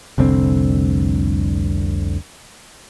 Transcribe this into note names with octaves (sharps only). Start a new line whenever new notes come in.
F1 C2 D3 C4